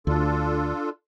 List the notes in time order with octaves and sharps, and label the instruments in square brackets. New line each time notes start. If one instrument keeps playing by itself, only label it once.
[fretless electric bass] D2 [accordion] D4 F4 A4